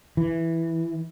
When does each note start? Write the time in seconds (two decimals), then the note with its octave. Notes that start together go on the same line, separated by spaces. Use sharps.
0.17 E3